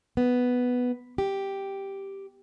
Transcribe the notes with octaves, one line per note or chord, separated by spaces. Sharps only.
B3
G4